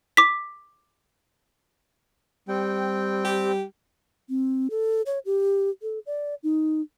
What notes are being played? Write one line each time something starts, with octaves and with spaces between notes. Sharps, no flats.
D6 B6
G3 C4 G5
G4
C4
A4
C#5
G4
A4
D5
D#4